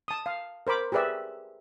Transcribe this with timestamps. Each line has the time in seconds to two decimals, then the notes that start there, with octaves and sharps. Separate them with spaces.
0.08 A5 D#6
0.26 F5
0.67 A#4 C5 B5 D6
0.92 G4 G#4 B4 D5 E5